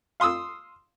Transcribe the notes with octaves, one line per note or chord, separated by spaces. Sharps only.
F5 C6 D#6 E6